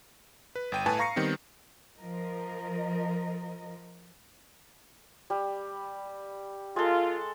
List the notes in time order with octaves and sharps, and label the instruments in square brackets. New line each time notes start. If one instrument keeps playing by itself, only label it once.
[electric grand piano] B4
G1 G5 D#7
A2 B4 G#5 A5
F5 A#5 C#6 A#6 C7 C#7
D#3 G3 B3 C4
[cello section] F3 A#4 D#5
[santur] G3
[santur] G#3 A4 [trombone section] F4